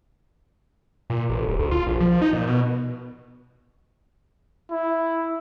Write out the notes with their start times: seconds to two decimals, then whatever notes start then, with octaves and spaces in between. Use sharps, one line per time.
1.10 A#2
1.30 A1
1.47 D1
1.59 D2
1.71 F4
1.87 A#1
2.00 F3
2.22 D#4
2.33 A#2
2.47 B2
4.71 E4